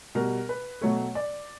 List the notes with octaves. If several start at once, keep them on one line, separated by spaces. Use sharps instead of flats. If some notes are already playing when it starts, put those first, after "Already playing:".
B2 G3 A#4
B4
B2 F#3 A3 C#5
D5